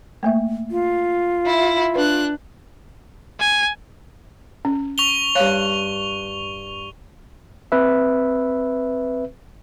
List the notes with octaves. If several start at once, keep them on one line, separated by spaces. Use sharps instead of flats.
A3 A#3 E5
F4
E4 E5
D4 B4 F#6
G#5
C#4
C#6 F7 G7
G2 C#5 F5 F#6
C4 B4 E5